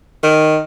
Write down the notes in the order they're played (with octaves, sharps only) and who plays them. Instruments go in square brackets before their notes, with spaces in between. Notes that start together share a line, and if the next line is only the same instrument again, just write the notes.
[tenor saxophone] D#3